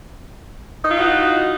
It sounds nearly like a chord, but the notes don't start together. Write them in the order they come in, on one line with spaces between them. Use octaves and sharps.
D#4 F4 E3 F#4